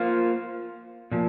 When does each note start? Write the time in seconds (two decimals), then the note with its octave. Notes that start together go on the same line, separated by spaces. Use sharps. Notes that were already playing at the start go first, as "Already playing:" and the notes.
Already playing: A#3 F4 C5
1.11 A#2 F3